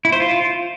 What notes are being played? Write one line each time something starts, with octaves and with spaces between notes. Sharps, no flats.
E4
C5
F4